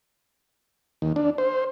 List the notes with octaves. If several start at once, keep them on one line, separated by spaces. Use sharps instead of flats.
D#2
D4
C5